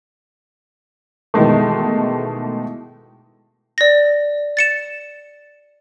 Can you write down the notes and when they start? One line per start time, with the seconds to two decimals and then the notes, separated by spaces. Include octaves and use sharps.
1.34 B2 D#3 E3 G#3 A3
3.78 D5 A#6
4.57 A6 C#7 E7